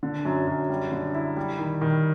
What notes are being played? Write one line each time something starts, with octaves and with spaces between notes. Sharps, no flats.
D3
F#2
F#2
G3
D3
E4
G3
D#3
D#3